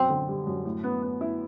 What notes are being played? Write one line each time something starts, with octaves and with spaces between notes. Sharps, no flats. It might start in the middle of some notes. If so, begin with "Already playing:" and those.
Already playing: F#2 B2 C4
D3
G3
F#2
A2
B3
B3
E4